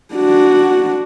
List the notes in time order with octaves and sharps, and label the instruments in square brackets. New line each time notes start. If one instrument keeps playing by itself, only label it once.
[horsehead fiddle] D4 F#4